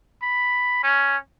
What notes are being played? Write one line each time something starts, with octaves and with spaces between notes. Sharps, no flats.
B5
C#4